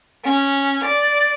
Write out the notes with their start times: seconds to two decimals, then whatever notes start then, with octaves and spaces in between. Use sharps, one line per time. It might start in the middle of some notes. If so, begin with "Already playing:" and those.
0.24 C#4
0.83 D5